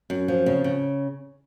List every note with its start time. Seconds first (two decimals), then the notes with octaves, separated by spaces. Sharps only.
0.10 F#2
0.28 F3
0.46 C#3
0.64 C#3